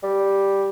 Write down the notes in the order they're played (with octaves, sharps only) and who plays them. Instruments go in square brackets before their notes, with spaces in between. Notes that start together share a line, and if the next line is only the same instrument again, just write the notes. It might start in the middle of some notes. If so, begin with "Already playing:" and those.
[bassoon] G3